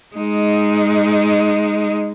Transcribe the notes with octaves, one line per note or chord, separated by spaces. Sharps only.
G#3 D#4